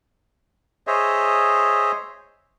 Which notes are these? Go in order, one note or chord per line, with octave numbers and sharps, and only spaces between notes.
G#4 C5 C#5 D#5 E5